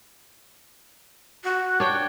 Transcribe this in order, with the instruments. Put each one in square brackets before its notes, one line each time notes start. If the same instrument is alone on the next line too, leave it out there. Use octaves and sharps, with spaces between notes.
[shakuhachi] F#4
[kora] D4 C#5 G5